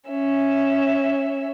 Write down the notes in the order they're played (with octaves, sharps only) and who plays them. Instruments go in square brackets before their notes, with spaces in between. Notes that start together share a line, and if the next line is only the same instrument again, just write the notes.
[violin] C#4 E5